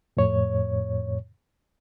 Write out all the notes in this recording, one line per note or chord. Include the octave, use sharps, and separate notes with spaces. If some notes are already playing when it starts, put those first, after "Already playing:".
F2 A2 C#5